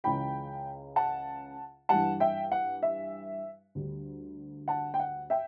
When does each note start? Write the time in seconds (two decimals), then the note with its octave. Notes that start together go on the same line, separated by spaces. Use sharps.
0.04 C#2 C#3 E3 G5 B5
0.96 F#5 A5
1.89 G2 E3 G3 F#5 A5
2.20 E5 G5
2.52 F#5
2.83 E5
3.75 D2 D3 G3 D4
4.68 F#5 A5
4.94 G5
5.00 F#5
5.30 E5 G5